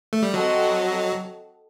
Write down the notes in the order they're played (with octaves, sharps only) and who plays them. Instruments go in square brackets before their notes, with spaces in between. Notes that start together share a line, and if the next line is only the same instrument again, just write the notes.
[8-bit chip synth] A3
G3
[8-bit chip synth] F#3 [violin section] C4 F#4 A4 D#5 F#5